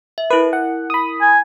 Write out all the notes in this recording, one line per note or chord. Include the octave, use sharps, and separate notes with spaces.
E5
E4 A#4 B4
F#5
B5 D#6
G#5